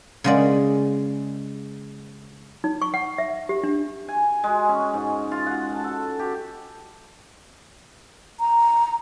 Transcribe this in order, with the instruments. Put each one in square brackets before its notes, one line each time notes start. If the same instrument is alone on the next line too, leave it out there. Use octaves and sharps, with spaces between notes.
[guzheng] C#3 G#3 D5
[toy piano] D#4
C#6
F#5
E5
G4
D4
[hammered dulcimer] G#5
G#3
C#4
G#2
F4
F#5
A5
A4
G4
[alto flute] A#5